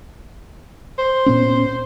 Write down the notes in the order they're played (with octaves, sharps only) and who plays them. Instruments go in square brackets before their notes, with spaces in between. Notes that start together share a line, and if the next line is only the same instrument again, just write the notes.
[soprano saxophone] C5
[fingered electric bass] A#2 B3 C#4